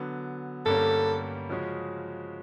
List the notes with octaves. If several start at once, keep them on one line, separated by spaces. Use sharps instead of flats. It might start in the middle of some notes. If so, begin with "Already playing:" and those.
Already playing: D3 F#3 B3
G2 D3 G3 A#3 C#4 A4
C#3 F3 G#3 C#4 F#4